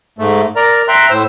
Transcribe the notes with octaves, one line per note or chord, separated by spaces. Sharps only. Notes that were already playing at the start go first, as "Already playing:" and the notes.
G#2 A3
A#4 D5 A#5
E5 G5 A#5 C6 F#6
A2 C5 E6